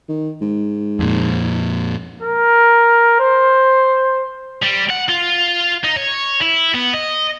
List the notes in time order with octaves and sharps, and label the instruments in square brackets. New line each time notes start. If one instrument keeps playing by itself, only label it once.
[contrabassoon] D#3
G#2
[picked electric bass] F2 A#2
[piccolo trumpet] A#4
C5
[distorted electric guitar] G3
F#5
F4
D#4
C#5
E4
B3
D#5